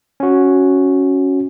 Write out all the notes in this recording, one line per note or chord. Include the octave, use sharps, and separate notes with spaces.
C#4 F#4